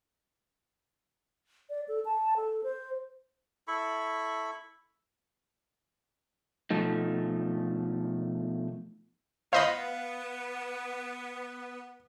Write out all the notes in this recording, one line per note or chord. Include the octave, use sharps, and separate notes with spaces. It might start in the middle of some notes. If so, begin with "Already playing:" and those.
D5
A4
A5
A4
C5
E4 A4 B5 C#6
B2 F3 A3 D#4
B3 C5 D#5 F5 B5